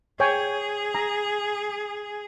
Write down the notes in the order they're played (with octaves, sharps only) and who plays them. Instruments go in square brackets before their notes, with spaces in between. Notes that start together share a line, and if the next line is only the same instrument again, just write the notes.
[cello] G#4 [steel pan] C#5 G5 G#5
[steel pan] A#5